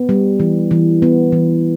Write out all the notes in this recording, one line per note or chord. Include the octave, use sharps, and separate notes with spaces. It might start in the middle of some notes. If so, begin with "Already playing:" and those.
Already playing: B3
G3
E3
E3
B3
E3